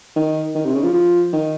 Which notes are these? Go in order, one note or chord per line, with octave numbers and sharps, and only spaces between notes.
D#3
D#3
C3
C#3
F3
F3
D#3